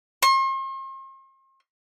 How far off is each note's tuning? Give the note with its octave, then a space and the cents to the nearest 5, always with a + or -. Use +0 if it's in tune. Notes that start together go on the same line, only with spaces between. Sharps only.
C6 +45